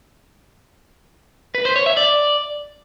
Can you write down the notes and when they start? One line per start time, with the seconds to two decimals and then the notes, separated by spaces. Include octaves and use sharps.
1.55 B4
1.65 C5
1.76 C#5
1.86 E5
1.97 D5